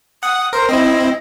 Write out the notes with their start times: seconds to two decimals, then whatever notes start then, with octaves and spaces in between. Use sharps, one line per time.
0.23 F#5 D#6
0.53 A#4 C5
0.69 C4 E4 D#5